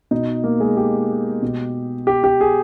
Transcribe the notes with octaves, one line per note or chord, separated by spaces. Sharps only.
B2 D#4
A#3
G#3
G4
B2
G4
G4
G#4